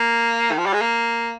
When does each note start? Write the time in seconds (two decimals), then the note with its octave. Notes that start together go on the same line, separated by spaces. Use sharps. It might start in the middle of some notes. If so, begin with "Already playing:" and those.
Already playing: A#3
0.52 D#3
0.58 F3
0.66 G3
0.73 G#3
0.81 A#3